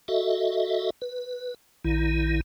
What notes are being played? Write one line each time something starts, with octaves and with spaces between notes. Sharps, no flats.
F#4 A4 D#5 E5
B4
A#1 D#3 E4